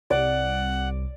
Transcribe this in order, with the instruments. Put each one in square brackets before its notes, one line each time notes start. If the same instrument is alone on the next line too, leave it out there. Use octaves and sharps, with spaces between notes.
[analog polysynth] C2 [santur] D5 [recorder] F#5